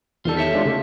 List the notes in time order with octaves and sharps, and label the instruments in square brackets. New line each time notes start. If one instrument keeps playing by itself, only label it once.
[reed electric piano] E2 D#3 A4 [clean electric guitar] G3 F4
[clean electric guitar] G4 C#5 E5
[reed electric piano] G#3 D4 F4
C#3 A3